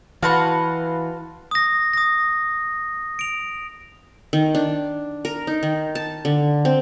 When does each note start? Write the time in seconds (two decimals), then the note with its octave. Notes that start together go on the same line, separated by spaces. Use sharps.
0.23 E3 F#4 B4 F5 F#5 A5 C6
1.51 D#6 A#6
1.93 D#6 A#6
3.19 D7 F7
4.33 D#3
4.55 D4
5.25 A#4
5.47 D#4
5.63 D#3
5.95 A5
6.25 D3
6.65 C4